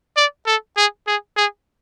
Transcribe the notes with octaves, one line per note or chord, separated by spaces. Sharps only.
D5
A4
G#4
G#4
G#4